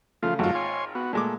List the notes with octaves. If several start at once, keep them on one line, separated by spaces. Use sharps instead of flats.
C#3 F3 A3 F4
G#1 F#2 F#3 A3 F4
C#5 G#5 C6
B3 F#4
A#2 G#3 A3 D6